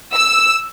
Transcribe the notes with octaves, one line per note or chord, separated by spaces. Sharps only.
E6